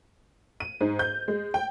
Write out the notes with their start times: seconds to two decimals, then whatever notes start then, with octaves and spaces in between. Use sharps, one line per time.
0.60 D#7
0.81 G#2
0.99 G6
1.28 G#3
1.54 G5